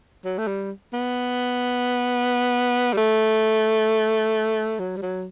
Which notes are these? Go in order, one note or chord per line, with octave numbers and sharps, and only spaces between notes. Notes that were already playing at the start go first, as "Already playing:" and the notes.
F#3
A3
G3
B3
G3
A3
F#3
G3
F#3